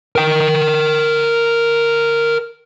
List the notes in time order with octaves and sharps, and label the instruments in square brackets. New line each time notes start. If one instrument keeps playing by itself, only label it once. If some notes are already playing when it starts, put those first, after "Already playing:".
[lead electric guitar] A#4 G5